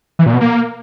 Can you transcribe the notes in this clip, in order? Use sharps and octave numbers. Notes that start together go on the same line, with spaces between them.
E3
A#2
B2
A#3